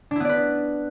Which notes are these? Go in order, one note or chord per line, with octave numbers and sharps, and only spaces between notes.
B3 D4 E4 B4 D5